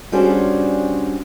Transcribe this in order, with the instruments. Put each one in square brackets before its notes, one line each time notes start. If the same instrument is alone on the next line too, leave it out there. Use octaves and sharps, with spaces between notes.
[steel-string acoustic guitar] G3 C#4 D4 F#4 G#4 C5